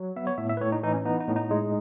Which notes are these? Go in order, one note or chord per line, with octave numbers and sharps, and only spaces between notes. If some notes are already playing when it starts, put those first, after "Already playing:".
Already playing: F#3
B3 E5
C#5
A2 E5
E5
B4
A2 C#5
D#4
E3 D#4
C#4
B3 D#4
D#4
A2
D#4
G#3